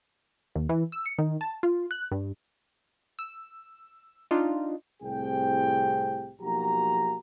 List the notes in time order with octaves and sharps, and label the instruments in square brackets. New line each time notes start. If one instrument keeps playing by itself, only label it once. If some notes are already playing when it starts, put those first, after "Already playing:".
[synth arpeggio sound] D#2
E3
E6
C#7
D#3
A5
F4
F#6
G2
[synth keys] E6
D4 D#4 F4
[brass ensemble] C2 A2 C4 G4 G#4 G5
B1 F3 A#3 F#4 G4 A#5